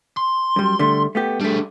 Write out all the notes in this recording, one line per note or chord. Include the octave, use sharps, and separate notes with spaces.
C6
F#2 G3
D3 G3 A3
A3 B3 G4
G3 A3 D4 G#4